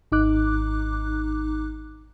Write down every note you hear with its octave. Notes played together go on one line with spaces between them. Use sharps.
G#1 D#4 D6 F#6